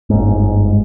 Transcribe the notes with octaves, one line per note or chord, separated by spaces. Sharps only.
G1 G#2